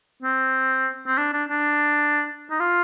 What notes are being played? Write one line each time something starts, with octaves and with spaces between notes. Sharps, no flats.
C4
C4
D4
D4
D4
D#4
F4